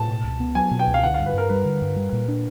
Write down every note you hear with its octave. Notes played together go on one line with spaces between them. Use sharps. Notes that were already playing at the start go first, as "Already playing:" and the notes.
Already playing: A2 A5
B2
C#2
B3
F#3 G#5
B2
G5
C#2
F5
D3 F#5
G2 F5
B4
G2 A#4
G3 B4
D3
G2
G3
A#2
D4